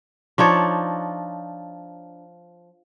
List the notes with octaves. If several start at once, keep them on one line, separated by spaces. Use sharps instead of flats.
F3 D4 D#4 C#5